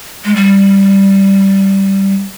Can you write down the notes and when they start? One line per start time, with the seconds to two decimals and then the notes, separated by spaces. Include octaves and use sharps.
0.25 G#3
0.36 G3